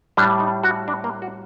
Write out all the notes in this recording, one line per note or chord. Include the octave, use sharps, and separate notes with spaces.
A2 G3 D4
D#4
F#4
D4
A#3
F#4